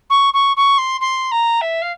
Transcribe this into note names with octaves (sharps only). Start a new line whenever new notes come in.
C#6
C#6
C#6
C6
C6
A#5
E5
F5